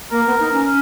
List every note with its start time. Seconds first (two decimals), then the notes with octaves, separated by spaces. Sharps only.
0.11 A#3 A#4
0.26 B3
0.39 D#4
0.52 C#4